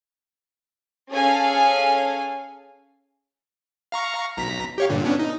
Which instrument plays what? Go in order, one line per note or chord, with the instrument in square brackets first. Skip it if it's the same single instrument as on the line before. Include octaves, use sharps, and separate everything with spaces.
[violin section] C#4 G#4 A4 F5 G#5
[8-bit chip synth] F5 A#5 C#6
B1 A#5 B6
G4 C#5 F5
G2 A#2 D3
B3 C#4 D4
D#4